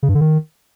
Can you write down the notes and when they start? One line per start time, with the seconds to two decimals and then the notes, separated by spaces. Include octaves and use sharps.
0.03 C#3
0.09 G2
0.15 D3
0.21 D#3